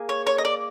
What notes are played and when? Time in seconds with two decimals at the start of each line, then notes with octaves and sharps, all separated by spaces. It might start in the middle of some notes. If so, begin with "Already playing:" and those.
Already playing: A#3 G#4
0.09 C#5
0.27 C#5
0.38 D#5
0.45 D5